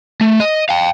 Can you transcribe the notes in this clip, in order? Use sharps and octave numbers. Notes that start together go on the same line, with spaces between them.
A3
D#5
F5 G5